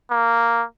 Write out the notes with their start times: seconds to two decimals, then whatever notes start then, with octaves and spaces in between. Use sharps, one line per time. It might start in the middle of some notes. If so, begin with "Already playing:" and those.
0.11 A#3